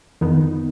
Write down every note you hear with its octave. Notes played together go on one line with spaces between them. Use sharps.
F2 D#3 B3 D#4